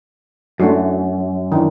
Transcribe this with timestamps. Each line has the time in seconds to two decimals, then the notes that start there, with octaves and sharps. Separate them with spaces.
0.60 F#2 A3 D4 F#4
1.52 D#3 E3 D4